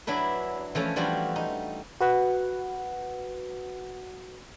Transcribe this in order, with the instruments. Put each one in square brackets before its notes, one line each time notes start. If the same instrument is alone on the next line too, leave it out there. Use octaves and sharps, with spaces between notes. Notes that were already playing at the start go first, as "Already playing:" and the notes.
[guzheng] F#3 D4 E4 B4
E3 F3 A3 C#4
E3 F3 G3 D4 F4 F#4
D#4
[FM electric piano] F#4 B4 F#5